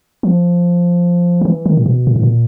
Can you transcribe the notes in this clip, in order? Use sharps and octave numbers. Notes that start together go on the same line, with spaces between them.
F3
D#3
E3
D#3
A#2
B2
A#2
A2
A#2